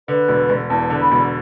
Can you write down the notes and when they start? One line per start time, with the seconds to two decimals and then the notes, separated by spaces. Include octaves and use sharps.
0.08 D3 B4
0.28 E1
0.50 E1
0.70 E2 A5
0.90 D3
1.01 B5
1.12 E1